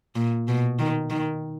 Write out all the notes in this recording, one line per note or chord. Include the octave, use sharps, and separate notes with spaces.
A#2
B2
D#3
D#3